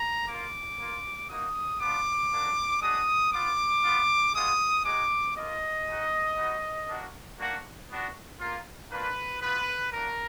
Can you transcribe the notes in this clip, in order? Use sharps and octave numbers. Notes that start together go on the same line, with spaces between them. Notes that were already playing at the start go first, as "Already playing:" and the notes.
Already playing: A#5
A#3 F4 D6
A#3 F4
A#3 D#4 F#4 D#6
B3 D4 F4 D6
A#3 D4 F#4
G#3 D4 F#4 D#6
B3 F4 D6
B3 F4
G#3 B3 F4 D#6
G#3 D#4 F#4 D6
A#3 F4 D#5
G#3 D#4 F#4
B3 D#4 F#4
A#3 D4 F#4
A#3 D4 F#4
B3 D4 F#4
A#3 F4
A#3 D4 F4 B4
B3 F4 B4
A#3 D4 F#4 A#4